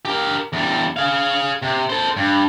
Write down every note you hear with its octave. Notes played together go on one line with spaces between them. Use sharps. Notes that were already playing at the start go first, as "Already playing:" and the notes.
G4 A#4
E2 G3
G#4 F5
C3
A4 C5
G2